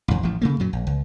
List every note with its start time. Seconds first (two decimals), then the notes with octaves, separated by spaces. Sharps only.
0.08 A1 F2
0.23 A1 F3
0.42 C#3 A3 A#3
0.60 F#2 A#2 F#3
0.73 A#1
0.87 C#2